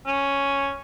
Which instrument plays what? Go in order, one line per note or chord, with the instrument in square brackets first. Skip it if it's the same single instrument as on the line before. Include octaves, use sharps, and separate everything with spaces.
[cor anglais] C#4